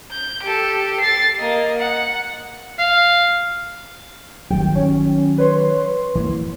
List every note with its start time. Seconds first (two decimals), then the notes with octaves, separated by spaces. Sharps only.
0.12 G6
0.43 G4 A4
1.00 A6 C7
1.39 A#3 D#5
1.78 F#5
2.79 F5
4.50 G1 D#3 F#3 G5
4.75 C#4
5.38 B4 C#5 C6
6.15 E3 A#3